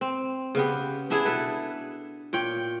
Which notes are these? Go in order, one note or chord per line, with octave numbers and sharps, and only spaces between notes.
C4
C#3 B3 G4
B3 D4 E4 G#4
B2 A4 B4
A#2 C#5 G5